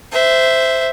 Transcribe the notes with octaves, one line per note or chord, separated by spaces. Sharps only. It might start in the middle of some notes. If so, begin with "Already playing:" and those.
C5 E5